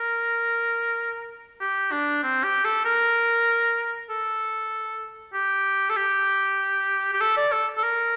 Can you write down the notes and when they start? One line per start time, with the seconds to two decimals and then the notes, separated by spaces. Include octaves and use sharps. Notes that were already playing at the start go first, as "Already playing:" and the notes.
Already playing: A#4
1.61 G4
1.92 D4
2.23 C4
2.44 G4
2.65 A4
2.85 A#4
4.10 A4
5.34 G4
5.89 A4
5.96 G4
7.13 G4
7.21 A4
7.37 D5
7.52 A4
7.78 A4
7.83 A#4